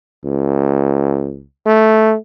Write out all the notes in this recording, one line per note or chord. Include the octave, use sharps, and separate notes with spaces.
C#2
A3